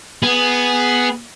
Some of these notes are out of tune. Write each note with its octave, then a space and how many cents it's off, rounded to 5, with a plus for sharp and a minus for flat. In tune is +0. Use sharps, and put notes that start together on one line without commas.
B3 +0 G#4 +0